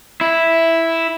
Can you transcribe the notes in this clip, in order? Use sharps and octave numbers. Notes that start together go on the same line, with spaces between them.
E4